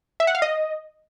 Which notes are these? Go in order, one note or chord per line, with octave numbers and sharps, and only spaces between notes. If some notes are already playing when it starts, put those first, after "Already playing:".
E5
F#5
F5
D#5